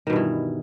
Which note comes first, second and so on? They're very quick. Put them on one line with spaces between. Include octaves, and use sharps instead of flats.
D#3 B2 G2 E3